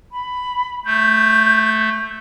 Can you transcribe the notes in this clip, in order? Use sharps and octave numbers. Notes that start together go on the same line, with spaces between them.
B5
A3 G6